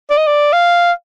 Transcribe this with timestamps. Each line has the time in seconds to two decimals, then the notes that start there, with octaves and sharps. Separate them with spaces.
0.10 D5
0.18 D#5
0.27 D5
0.53 F5